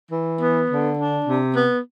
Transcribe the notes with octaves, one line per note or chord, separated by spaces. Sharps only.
E3
B3
D3
D4
C3
B3